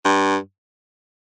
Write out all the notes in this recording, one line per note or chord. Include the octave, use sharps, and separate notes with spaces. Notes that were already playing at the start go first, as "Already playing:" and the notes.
G2